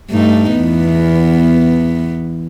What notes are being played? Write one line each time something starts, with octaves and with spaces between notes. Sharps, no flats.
G2 A3 D#4
E2 B3